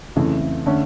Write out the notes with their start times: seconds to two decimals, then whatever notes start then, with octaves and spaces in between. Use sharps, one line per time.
0.16 F2 C#3 E3 A3
0.66 D3 A3 C#4